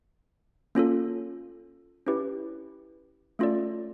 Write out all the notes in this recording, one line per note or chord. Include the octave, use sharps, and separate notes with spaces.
A#3 C#4 F4 A4
C#4 E4 G4 B4
A3 C#4 F4 A4 D5